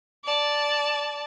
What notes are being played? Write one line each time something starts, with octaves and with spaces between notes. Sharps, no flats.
D5 A5